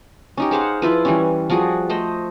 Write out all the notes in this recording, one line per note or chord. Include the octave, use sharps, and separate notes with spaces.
C#4 D#4 G4
G#4 C5 F5 F#5
F3 E4 F4 B4
E3 G3 C#4
F3 G3 F#4 G#4
A3 C5 D#5